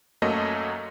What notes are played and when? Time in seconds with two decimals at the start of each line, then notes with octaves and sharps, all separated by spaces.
0.22 F#2 F#3 A3 A#3 D#5 A#6